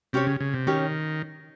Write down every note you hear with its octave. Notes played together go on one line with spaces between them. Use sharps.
C3 C#4 G4 C#5
C#3
C#3
C3
D#3 C#4 G4 C#5